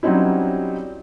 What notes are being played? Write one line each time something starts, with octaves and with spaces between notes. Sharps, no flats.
F#3 G3 C4 C#4 D#4 E4